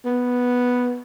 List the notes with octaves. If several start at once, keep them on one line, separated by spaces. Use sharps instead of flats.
B3